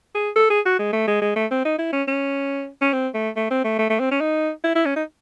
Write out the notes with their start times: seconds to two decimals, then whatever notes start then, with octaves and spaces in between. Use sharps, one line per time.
0.15 G#4
0.36 A4
0.50 G#4
0.65 F#4
0.79 G#3
0.93 A3
1.07 G#3
1.22 G#3
1.36 A3
1.51 C4
1.65 D#4
1.79 E4
1.93 C#4
2.08 C#4
2.81 C#4
2.93 C4
3.14 A3
3.36 A3
3.51 C4
3.64 A3
3.79 A3
3.90 A3
4.00 C4
4.11 C#4
4.21 D#4
4.64 E4
4.75 E4
4.86 C#4
4.96 D#4